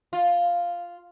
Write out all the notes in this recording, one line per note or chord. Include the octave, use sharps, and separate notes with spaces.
F4